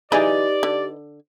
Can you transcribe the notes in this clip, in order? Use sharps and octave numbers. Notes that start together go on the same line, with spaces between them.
E3 D#4 G4 G#4 B4 D5 D#5 B5
D3